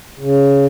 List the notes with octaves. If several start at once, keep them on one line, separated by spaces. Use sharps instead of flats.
C#3